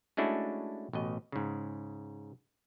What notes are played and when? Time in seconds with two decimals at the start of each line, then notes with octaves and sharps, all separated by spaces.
0.17 G#3 A3 C#4 D4 E4 F#4
0.93 A1 B2 D#5
1.32 G#2 C#3